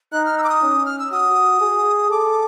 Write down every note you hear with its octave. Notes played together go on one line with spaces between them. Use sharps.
D#4 F#6
F6
E6
D6
D#6
C#4
F6
E6
F#4 D#6
G#4
A4 D6